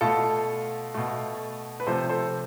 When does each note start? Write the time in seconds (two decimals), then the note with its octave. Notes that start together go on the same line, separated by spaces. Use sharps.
0.01 B2 A3 F4 A4
0.94 B2 A3
1.80 B4
1.87 C3 F3 A3 A4 C5
2.09 A4 C5